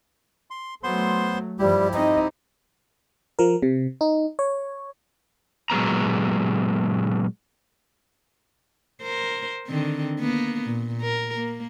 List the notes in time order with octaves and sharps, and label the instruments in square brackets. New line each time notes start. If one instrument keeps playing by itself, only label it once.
[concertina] C6
[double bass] F#3 A3 [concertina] B3 C5 C6
[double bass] G2 F3 [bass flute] G3 [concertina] E4 G4
[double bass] C4 D#4 [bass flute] D#5
[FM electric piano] F3 A#4
C3
D#4
C#5
[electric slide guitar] A#2 F#3 G#3 B3 A#5
[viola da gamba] A#4 C5
D3 D#3 C4
A#3 B3
A#2
A#4
A#3